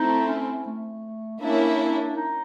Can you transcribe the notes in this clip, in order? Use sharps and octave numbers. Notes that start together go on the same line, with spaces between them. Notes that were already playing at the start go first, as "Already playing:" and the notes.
Already playing: A3 C4 D#4 E4
C#4
A3
A#3 C#4 D4 E4
D#4